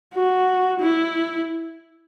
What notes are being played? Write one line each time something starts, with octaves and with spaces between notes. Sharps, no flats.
F#4
E4